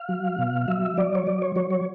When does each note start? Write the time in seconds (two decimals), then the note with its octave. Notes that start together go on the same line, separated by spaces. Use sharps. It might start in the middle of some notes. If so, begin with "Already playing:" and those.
Already playing: F5
0.09 F#3
0.38 B2
0.68 F#3 E5
0.97 F#3 D5
1.15 C#5
1.27 F#3 D5
1.42 C#5
1.56 F#3 C#5
1.70 C#5